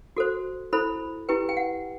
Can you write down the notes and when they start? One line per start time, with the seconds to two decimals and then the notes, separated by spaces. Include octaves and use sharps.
0.17 F#4 A4 C5
0.73 E4 A4 C5 B5
1.29 E4 G4 B4 G5
1.49 G5
1.57 F#5